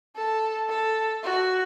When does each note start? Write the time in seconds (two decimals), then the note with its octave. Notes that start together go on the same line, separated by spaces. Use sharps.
0.16 A4
0.70 A4
1.24 F#4